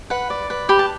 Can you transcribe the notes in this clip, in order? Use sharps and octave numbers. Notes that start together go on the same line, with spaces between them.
B4 F#5
D5
B4
G4 B5
A5